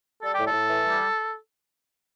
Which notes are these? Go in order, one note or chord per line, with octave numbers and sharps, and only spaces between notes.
G3 A4
A2 G4
A4
A2
E3
G3